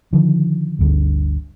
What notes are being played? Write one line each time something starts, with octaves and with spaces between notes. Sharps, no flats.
D3 D#3 F3
G1 D2 G2